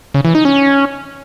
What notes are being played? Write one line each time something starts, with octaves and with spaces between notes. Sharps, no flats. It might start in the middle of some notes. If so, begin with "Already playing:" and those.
C#3
E3
D#4
C#4